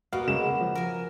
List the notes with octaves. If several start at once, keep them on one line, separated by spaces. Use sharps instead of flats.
B2 A#3 B3 F#4 F5
C#3 G#3 E7
F3
A#4 G#5